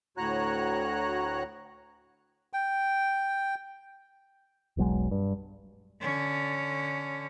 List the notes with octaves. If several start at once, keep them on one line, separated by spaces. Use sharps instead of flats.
D2 A2 F#4 C#5 A#5 F#6
G5
E1 B1 F#3 G#3
G2
D3 C#4